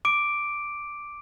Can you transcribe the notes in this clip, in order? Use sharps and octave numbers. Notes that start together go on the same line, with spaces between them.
D6 D7